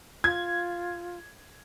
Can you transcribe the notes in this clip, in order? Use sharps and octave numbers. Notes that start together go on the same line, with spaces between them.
F4 G#6